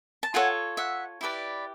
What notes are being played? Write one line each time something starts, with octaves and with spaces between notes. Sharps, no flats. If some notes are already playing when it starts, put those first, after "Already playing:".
A5
F4 A4 C#5 F#5 G#5
E5 F#5
E4 G4 B4 D5